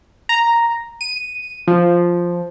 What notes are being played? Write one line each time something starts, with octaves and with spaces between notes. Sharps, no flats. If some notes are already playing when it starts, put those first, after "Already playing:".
A#5
D#7
F3